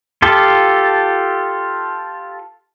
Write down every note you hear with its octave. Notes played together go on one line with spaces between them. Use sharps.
F4 G4 A4